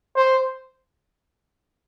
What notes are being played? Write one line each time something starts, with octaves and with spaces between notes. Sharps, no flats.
C5